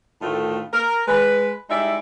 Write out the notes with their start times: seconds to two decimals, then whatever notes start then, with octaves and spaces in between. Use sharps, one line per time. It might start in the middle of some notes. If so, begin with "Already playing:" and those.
0.22 D2 A2 D3 D#3 A3 F4
0.73 A#4
1.07 G#3 B4
1.70 G3 G#3 D#4 E4 D5 E5